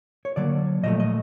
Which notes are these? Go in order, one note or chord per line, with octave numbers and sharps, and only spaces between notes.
C#5
D3 F#3 A#3 D5
A#2 F3 A3 D#5
D#5